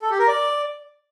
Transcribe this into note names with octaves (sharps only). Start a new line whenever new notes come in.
A4
G4
A#4
D5